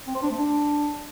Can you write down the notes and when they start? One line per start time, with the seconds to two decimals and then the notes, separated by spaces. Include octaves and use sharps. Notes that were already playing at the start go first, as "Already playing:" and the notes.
0.07 C4
0.15 C5
0.23 D4
0.30 A3
0.38 D4